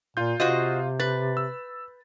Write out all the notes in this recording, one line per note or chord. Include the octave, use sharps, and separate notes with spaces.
A#2 F4 G6
C3 F4 F#4 C5 D#5
B4 A6
E6